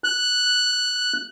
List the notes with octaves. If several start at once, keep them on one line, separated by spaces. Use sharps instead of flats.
F#6